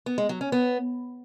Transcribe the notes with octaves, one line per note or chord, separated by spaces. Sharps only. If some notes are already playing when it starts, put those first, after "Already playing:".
B3
G#3
F#3
C#4
B3